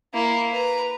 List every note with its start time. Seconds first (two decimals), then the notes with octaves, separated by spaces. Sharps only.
0.14 A#3 E4
0.51 B4 A#5